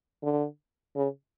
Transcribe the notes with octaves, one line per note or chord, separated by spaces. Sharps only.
D3
C#3